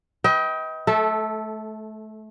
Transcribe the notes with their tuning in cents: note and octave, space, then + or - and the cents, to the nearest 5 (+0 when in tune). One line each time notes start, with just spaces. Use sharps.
B4 +0 D#5 +35 G5 -5
A3 -25 A4 +0